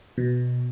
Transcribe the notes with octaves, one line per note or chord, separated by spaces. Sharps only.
B2